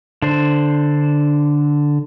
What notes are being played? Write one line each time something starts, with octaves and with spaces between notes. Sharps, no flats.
D3 D4 C5